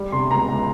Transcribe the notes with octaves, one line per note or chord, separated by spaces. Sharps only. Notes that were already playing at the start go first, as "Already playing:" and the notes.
Already playing: G3
C3 C6
C#2 A#5
C#2